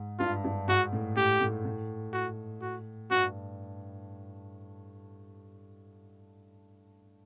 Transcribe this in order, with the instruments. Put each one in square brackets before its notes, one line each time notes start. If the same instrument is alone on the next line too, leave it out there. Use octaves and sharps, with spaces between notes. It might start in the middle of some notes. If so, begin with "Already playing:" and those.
Already playing: [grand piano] G#2
[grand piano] G2 [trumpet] F4
[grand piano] G2
[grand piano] G#2 [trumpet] F#4
[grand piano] A2
[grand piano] A2 [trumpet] G4
[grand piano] A2
A2
[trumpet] F#4
F#4
[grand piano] G2 [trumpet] F#4